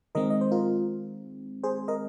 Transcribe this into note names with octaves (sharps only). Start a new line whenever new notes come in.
D#3 G#3 C4 A#4 D#5
D#5
C5
F4 A#4
G#4 C5
A#4 D#5